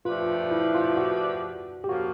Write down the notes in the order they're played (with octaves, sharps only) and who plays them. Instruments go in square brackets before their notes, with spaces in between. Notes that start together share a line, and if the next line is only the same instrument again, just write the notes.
[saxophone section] F3 A3 D4 G4 B4 [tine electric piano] F4
[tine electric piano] E4
F4
F#4
G4
[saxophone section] F3 A#3 C#4 F4 G#4 [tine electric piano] F#4